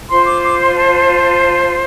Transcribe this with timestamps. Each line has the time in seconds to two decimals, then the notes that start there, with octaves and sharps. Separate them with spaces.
0.10 F4 C5 C6
0.26 D6
0.44 D6
0.59 C6
0.76 A5